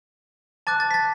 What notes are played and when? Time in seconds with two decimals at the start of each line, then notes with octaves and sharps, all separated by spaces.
0.67 A5 D6 F#6 A6
0.80 A6
0.91 B6
0.94 A6